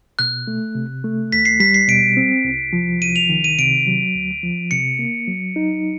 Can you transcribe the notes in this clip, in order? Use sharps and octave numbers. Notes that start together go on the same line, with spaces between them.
B2 F#6
A3
C3
A3
D#2 B6
C7
G3 B6
C7
B2 D7
C4
C2
F3
C2 D#7
F7
D#3
D#7
C3 D7
F#3
D2
F3
C3 C#7
A#3
F#3
D#4